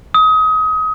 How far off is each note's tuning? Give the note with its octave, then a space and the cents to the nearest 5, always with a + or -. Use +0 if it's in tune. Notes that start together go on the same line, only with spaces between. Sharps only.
D#6 +25